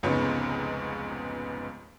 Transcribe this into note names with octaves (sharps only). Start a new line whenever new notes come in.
F1 C#2 G#2 C#3 B3 C#5